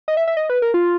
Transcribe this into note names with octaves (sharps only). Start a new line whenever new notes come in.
D#5
E5
E5
D#5
B4
A#4
F4